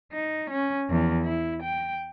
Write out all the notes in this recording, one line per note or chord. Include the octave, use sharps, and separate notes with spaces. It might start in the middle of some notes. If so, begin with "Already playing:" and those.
D#4
C#4
E2 F3
E4
G5